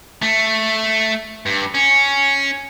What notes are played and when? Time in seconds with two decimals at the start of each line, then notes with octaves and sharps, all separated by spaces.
0.22 A3
1.46 G2
1.75 C#4